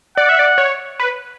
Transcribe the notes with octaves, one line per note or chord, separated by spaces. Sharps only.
D5 F#5
E5
D5
C#5
B4